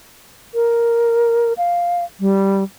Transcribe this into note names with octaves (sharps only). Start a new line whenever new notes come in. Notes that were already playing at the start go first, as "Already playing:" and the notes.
A#4
F5
G3